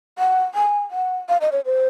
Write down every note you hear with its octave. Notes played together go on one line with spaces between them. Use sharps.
F#5
G#5
F#5
F5
D#5
C#5
C5